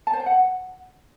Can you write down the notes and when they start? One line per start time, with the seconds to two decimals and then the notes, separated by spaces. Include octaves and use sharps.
0.07 A5
0.13 C5
0.20 G5
0.26 F#5